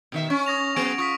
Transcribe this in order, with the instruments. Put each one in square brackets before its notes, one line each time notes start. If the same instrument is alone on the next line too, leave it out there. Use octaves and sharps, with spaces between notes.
[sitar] B2 D#3 E5
[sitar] C#4 [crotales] C#6
[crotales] D#6 A#6 F7
[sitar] F#3 B3 G#4 [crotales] D7
[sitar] F4 [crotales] C#6 D#6 B6